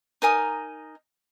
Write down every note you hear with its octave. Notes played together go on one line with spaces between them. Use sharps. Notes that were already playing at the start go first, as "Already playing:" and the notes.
D#4 A#4 G#5 D#6